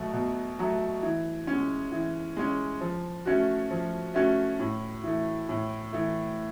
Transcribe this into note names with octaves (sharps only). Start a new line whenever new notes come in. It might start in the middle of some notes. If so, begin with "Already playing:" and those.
Already playing: B2 F#3 A3
B2
F#3 A3
E3
G#3 C#4
E3
G#3 C#4
F3
A3 C#4 F#4
F3
A3 C#4 F#4
A2
E3 A3
A2
E3 A3